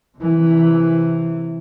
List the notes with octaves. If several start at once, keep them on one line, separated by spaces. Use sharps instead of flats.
C3 E3